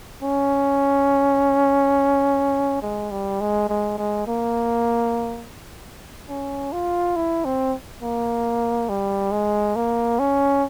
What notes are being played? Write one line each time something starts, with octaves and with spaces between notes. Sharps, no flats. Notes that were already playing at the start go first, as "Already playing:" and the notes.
C#4
G#3
G3
G#3
G#3
G#3
A#3
C#4
F4
E4
C4
A#3
G3
G#3
A#3
C#4